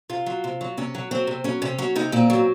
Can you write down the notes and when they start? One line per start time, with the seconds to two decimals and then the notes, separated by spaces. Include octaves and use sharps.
0.09 C3 F4
0.26 F#3
0.44 C3
0.61 F#3
0.77 C3 C#4
0.95 F#3
1.11 F#3 C4
1.27 C3
1.44 F#3 C#4
1.62 C3 C#4
1.78 F#3 C#4
1.96 C3 D#4
2.12 A#2 C4
2.30 F#3